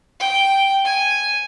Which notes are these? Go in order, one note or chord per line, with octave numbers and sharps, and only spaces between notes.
G5
G#5